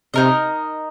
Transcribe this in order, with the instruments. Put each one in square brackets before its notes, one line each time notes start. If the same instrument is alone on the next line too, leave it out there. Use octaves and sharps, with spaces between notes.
[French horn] C3 [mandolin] D#4 A#4 D#5